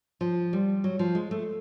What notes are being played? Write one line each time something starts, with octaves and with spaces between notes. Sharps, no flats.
F3
G3
F#3
F3
G#3
A3